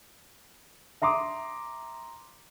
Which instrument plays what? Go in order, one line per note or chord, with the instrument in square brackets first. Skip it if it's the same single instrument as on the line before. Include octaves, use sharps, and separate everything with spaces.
[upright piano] E5 A#5 C6 D6 D#6